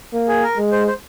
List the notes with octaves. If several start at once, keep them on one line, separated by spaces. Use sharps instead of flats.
A#3
G#4
A#4
G#3
C5
C5